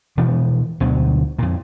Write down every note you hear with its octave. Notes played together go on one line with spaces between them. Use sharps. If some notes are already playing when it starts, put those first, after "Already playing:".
B2 E3 F3 B3
D2 B2 D3 F#3
F2 A#2